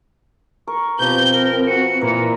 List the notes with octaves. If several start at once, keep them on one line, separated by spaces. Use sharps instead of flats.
A#4 C#6
B2 F3 C4 G4 B4 G6 G7
A#4
F#4 C#7
A#2 E3 A#4 B4